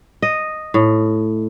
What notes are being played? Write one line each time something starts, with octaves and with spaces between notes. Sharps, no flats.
D#5
A2